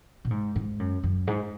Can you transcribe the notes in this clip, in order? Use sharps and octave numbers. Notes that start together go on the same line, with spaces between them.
A#2
G#2
G#2
F#2
F#2
G#2